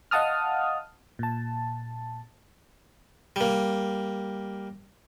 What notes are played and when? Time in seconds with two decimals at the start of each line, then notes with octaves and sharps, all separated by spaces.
0.11 D#5 F5 F#5 A5 D#6 F6
1.19 A#2 A5
3.36 G3 A#3